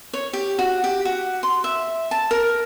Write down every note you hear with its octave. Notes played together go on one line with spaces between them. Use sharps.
C#5
G4
F#4
G4
F#4
C6
E5
A5
A#4